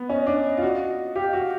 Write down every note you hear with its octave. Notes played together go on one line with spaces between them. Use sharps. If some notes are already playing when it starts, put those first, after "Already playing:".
Already playing: B3
C#4 D#5
D4
F4
F#4
G4 F5
F#4